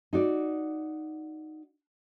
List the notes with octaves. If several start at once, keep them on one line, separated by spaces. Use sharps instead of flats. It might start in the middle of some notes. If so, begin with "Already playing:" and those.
D#4 F#4 D5